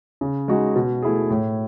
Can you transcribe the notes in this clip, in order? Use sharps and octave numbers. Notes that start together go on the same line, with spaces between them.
C#3
G#3 D#4 F#4
B2
A3 E4 G#4
A2